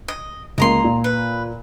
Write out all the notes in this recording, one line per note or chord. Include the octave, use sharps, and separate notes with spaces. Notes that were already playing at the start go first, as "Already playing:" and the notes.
D#5
C#2 A#3 D#5 A#5 C6
A#2
B4